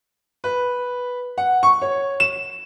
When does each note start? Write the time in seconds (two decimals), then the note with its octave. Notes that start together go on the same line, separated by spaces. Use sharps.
0.44 B4
1.38 F#5
1.63 C#6
1.82 C#5
2.20 E7